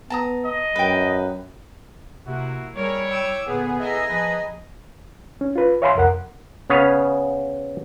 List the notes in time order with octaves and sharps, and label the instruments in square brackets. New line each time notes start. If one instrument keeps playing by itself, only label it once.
[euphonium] B3 [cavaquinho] A5 A#5 D#6
[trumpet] D#5
[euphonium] F#2 [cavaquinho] B4 G5
[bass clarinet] C3 [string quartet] A#3 [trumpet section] E4 F#4
[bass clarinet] G3 [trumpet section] E4 C#5 [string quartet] G#4 A#4
[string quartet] G5 D6 E6
[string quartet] A#2 [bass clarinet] D3 [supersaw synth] B3 G#4
[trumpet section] E4 A4 E5 [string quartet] G#4 G#5 A#5 [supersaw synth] D#5
[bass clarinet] F3 [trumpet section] B4
[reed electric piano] C#4
F4 B4
C#5 E5 F5 G#5 B5 C6
C2 F2 A#4 F#5
[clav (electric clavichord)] C#3 B3 C#4 C#5 F5